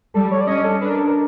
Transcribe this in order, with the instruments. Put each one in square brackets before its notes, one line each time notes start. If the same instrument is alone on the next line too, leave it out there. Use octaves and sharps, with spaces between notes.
[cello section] G3 [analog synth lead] A4
[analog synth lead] C#5
D5
[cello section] C#4 [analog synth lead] D#5
[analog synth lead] A4
[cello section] D4 [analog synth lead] B4
[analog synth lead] A#4
A4
A#4